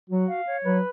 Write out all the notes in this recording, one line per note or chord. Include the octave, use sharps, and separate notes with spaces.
F#3 F#4
F5
C#5
F#3 B4